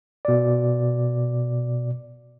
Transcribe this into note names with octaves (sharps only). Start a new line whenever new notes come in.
B2 D5